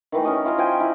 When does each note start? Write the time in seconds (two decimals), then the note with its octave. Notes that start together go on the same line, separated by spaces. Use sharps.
0.12 D#3 E3 A3
0.25 C#4 A#4 D#5
0.45 E4 F4 A#4 D#5
0.58 F3 G5 G#5
0.80 E4